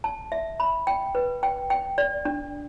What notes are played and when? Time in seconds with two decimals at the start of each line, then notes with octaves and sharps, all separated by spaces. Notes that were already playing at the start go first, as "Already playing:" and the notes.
0.04 A5
0.32 E5
0.60 B5
0.87 G5
1.15 B4
1.43 G5
1.70 G5
1.98 D5
2.25 D4